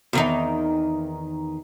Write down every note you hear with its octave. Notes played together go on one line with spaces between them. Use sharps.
E2 D#3 D#4